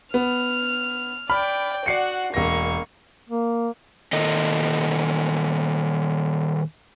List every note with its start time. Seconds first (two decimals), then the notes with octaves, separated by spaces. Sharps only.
0.14 B3 F6
1.30 D5 G5 B5 F6
1.86 F#4 D5 F#5 C7 C#7
2.34 E1 A#3 C#6 A#6
3.29 A#3
4.13 A#2 D#3 A4 D#5